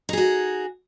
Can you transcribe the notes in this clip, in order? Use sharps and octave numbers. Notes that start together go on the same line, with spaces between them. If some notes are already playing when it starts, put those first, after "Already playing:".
D#4 F#4 G#4